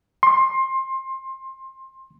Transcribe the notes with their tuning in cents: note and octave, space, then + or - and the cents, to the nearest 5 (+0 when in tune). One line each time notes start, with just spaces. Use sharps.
C6 +20